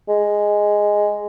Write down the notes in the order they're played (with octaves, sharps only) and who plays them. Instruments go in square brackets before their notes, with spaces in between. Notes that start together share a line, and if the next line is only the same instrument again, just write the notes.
[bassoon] G#3